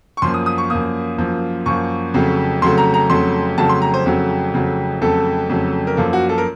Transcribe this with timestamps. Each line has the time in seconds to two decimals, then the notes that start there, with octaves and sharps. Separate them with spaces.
0.17 C#6
0.22 F#2 F3 A#3 C6
0.34 D#6
0.46 D#6
0.58 C#6
0.70 F#2 F3 A#3 D#6
1.18 F#2 F3 A#3
1.66 F#2 F3 A#3 C#6
2.14 F2 C#3 F#3 A3
2.62 F2 C#3 F#3 A3 C6
2.78 A#5
2.94 A#5
3.10 F2 C#3 F#3 A3 C6
3.57 F2 C#3 F#3 A3 A5
3.69 C6
3.82 A#5
3.94 C5
4.06 F2 C#3 F#3 A3
4.54 F2 C#3 F#3 A3
5.01 F2 C#3 F#3 A3 A4
5.49 F2 C#3 F#3 A3
5.87 A#4
5.97 F#2 F3 A#3 A4
6.13 F#4
6.29 A4
6.38 A#4